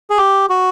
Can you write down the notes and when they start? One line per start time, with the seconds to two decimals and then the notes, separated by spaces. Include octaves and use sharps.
0.10 G#4
0.18 G4
0.49 F#4